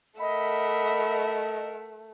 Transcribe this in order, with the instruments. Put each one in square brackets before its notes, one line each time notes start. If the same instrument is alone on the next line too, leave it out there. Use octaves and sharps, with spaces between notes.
[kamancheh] A3 [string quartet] A#4 E5 F#5 [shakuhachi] D#5 [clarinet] B5